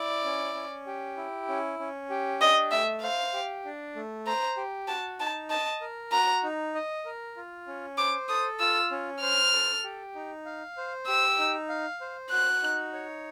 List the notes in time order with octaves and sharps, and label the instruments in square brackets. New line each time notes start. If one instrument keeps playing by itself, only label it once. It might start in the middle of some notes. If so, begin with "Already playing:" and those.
Already playing: [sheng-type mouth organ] E4 [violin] D5
[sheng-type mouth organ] C#4
C#4
G4
E4
C#4
C#4
G4
[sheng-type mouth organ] D4 [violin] D#5
[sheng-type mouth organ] A3 [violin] E5
[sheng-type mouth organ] C5 [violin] F5
[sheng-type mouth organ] G4
D4
A3
[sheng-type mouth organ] C5 [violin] A#5
[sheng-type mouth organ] G4
[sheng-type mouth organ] F#4 [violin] A5
[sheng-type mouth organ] D#4 [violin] A5
[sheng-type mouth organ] D#5 [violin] A5
[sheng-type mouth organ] A#4
[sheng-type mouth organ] F#4 [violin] A#5
[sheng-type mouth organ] D#4
D#5
A#4
F4
C#4
[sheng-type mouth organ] C5 [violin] D6
[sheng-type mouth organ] A4 [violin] D#6
[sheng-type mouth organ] F4 [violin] E6
[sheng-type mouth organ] C#4
[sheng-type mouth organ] C5 [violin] F6
[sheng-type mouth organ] A4
G4
D#4
F5
C5
[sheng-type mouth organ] G4 [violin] E6
[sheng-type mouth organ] D#4
F5
C5
[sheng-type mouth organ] F#4 [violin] F#6
[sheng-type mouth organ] D#4
C#5